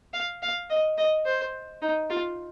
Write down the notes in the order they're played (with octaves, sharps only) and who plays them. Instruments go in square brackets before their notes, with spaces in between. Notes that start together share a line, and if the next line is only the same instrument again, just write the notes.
[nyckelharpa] F5
F5
D#5
D#5
C5
D#4
F4